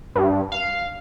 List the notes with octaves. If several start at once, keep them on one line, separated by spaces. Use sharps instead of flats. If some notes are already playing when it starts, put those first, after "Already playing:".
G2
F5